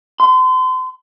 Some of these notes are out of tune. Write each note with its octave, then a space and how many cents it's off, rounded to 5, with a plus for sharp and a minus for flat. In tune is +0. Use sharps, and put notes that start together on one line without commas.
C6 -35